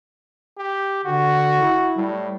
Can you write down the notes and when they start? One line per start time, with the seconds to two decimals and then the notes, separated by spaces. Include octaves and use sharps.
0.58 G4
1.05 D3 F#4
1.61 E4
1.97 A2 G3